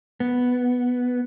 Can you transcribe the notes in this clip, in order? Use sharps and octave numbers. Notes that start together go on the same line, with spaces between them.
B3